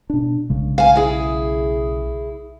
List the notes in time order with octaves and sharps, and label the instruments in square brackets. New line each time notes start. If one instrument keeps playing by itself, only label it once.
[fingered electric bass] B2 D4
B1 C#3 G#3
[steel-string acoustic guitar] F5 G#5
E4 G#4